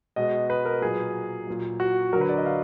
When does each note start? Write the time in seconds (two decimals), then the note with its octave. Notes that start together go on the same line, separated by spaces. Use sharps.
0.16 B2 G#3 D#5
0.50 B4
0.65 A#4
0.82 A#2 F#3 G#4
1.47 A#2 F#3
1.80 F#4
2.13 F#3 A#4
2.16 D3
2.21 B4
2.29 D5
2.37 D#5
2.46 F5